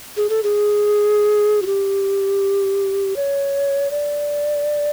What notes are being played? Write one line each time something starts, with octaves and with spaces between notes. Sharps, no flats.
G#4
A4
G#4
F#4
G4
C#5
D5